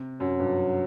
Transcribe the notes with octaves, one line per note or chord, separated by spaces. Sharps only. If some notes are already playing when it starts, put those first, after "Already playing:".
Already playing: C3
F#2 F#3
G2